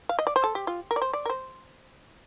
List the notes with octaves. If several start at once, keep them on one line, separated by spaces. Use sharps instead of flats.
F5
D#5
D5
C5
A4
G4
F4
A#4
D5
C5
D5
A#4
C5